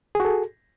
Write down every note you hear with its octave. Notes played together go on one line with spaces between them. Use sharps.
F#4 G#4 A4